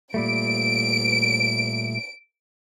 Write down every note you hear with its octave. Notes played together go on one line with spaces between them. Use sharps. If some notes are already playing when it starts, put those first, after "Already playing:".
A#2 G3 A3 D7